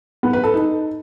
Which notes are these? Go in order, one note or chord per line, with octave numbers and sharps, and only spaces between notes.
B3
B4
A4
D#4